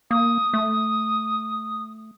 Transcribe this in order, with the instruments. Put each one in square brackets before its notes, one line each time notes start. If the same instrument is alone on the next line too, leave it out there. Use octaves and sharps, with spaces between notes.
[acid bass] A#3 [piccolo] D#6
[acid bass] A3